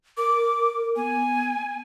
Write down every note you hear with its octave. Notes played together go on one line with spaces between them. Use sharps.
A#4 D6
B3 G#5